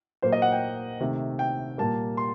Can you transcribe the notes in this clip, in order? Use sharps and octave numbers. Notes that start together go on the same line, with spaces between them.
A#2 F#3 A#3 C5
D#5
F#5
G5
C3 D#3 A3
G5
A#2 G3 A#3 A5
C6